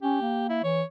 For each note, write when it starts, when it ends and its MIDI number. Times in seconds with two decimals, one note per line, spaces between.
0.03 0.17 61
0.03 0.47 67
0.22 0.61 58
0.50 0.63 64
0.64 0.83 52
0.64 0.83 73